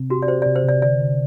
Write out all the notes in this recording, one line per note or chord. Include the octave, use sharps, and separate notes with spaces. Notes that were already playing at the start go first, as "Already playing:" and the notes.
Already playing: C3 C4
F#4 G4
D5
G4 C5
D5
C3
C5
C3 D5
D3 D5
D3